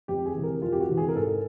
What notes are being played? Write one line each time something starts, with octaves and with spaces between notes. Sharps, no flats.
F2 G4
G#4
C3 E3
A#4
F2 F4
G4
F#4
C3 E3
G#4
A#4
G#2 A4